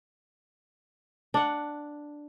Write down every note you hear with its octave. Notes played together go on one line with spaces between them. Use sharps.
D4 F#5